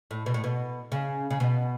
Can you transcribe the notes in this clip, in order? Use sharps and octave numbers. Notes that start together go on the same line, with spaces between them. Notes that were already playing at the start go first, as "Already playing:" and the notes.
A2
B2
A2
B2
C#3
C#3
B2